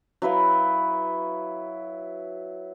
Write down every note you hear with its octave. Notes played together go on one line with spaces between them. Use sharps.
F#3 E4 B4 F5